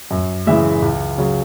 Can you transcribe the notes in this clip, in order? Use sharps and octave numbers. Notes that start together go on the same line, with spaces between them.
F#2
C#3 E3 G#3 E5
C#2
C#3 F#3